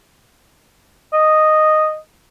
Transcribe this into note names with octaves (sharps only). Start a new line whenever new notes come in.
D#5